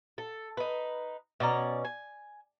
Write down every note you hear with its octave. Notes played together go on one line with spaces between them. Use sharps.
A4
D#4 B4
B2 C#4 D5 A#5
G#5